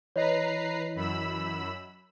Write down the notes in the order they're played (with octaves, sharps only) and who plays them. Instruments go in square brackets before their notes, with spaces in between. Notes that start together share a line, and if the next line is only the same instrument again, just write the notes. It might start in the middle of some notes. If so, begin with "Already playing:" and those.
[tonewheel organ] E3 [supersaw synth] B4 A#5 C7 [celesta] C#5 D#5
[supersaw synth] F#2 B5 E6